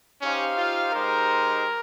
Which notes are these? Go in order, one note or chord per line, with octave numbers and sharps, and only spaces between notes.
C#4 D#4 G4 C5 F5
F4
G#3 D#4 G4 A#4 C5